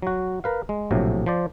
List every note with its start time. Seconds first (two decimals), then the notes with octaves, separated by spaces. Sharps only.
0.02 F#3 F#4
0.44 A#4 B4 F5
0.69 G#3
0.91 A#1 A2 C3 F#3
1.26 F3 C5 D5